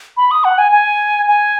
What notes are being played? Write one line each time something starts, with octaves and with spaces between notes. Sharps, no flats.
B5
D#6
F#5
G#5
G#5
G#5